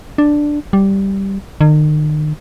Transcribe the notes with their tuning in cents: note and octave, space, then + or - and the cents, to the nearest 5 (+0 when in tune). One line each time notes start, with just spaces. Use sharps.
D4 +5
G3 -5
D#3 -40